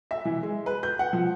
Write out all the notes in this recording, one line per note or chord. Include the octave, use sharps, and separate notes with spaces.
E5
E3
G#3
B4
G6
F#5
F3